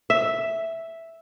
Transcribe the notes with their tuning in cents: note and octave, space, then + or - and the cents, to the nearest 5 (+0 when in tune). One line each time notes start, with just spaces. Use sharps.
E5 +0